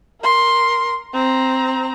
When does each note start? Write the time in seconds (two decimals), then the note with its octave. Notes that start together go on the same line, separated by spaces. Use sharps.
0.21 A#4 C6
1.14 C4 A#5